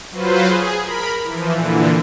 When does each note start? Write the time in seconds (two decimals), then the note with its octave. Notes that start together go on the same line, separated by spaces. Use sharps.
0.11 F#3 F4 B4 C5
0.48 G#4
0.80 A#4 B5
1.24 E3 F3
1.54 A#2 D3 E3